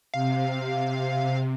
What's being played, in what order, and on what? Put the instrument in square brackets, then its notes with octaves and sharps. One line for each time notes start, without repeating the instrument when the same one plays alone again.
[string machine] C3 [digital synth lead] F5